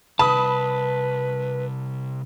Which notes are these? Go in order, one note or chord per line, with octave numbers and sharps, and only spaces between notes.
C2 B4 A5 B5 D#6